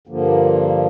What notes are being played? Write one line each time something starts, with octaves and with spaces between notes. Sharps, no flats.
G2 D3 F3 A#3